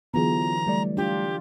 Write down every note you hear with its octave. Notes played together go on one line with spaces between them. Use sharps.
D3 E3 F#3 B3 F4 G#4 A#5
G3 A3 D5
D4 F4 G4